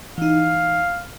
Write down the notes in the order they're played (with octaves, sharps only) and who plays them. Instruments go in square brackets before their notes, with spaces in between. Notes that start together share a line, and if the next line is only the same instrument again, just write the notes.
[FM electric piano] E3 D#4 [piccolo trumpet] F5